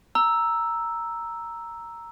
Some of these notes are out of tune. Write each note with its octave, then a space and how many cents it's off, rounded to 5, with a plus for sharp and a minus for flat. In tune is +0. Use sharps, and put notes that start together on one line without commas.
A#5 +0 E6 +0